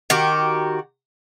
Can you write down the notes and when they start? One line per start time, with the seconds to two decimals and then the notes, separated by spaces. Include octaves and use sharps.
0.10 D#3 F#4 G4